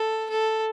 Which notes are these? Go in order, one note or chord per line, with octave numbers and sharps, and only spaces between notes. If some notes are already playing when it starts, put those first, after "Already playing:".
Already playing: A4
A4